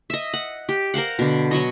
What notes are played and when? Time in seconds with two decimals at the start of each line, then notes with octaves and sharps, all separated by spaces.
0.10 D#5 E5
0.34 F#5
0.69 G4
0.94 A#4 C5 F5 F#5
1.19 B2 D3
1.51 F#3 C#5 D#5